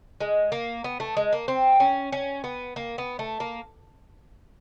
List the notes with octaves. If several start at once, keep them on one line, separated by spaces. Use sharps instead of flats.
G#3
A#3
B3
A3
G#3
A#3
C4
C#4
C#4
B3
A#3
B3
A3
A#3